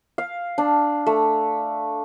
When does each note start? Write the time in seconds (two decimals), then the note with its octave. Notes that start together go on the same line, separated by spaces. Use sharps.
0.18 F5
0.58 D4
1.06 A3